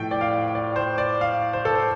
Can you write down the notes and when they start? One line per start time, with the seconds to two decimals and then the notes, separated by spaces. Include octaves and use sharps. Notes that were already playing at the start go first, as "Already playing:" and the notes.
Already playing: A2 F3 G5
0.11 D5
0.21 F5
0.55 D5
0.76 C5
0.98 D5
1.21 F5
1.53 C5
1.65 A4
1.75 C5